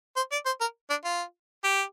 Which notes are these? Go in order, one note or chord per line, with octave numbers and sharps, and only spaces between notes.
C5
D5
C5
A#4
D4
F4
G4